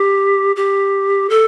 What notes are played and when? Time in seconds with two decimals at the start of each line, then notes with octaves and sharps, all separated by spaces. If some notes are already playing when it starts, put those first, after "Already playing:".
Already playing: G4
0.56 G4
1.30 A4